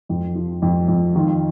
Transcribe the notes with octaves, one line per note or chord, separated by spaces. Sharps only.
F2
F3
F2
F2
D#3 F4